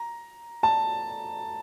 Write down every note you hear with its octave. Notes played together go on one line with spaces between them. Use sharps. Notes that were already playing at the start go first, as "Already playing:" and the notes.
Already playing: A#5
A5